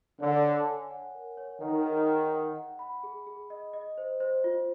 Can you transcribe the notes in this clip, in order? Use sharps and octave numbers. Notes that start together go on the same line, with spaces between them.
D3 C#5
C#5
G#5
F#5
A#4
C#5
D#3 F#5
G#4
F#5
F#5
F#5
B5
G#4
G#4
D#5
D#5
C5
C5
F4